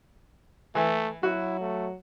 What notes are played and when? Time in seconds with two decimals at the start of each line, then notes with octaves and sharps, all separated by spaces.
0.75 E3 A3
1.23 F#3 E4 F#4
1.61 A3